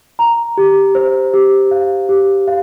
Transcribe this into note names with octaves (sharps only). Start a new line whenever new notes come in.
A#5
G4
C5
G4
F5
G4
F5